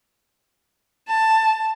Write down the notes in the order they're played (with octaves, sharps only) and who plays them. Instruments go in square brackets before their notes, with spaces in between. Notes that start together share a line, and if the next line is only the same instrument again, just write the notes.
[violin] A5